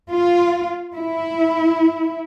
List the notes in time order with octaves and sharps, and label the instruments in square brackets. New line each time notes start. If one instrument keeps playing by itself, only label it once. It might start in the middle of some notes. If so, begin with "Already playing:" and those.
[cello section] F4
E4